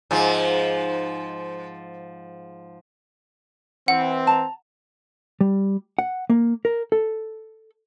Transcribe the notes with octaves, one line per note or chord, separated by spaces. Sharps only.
G#2 F3
E3 C4 F#5
A5 A#5
G3
F#5
A#3
A#4
A4